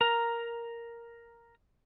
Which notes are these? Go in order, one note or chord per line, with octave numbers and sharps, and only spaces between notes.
A#4 A#5